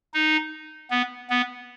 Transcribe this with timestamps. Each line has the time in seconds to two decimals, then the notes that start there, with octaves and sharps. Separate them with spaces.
0.14 D#4
0.90 B3
1.30 B3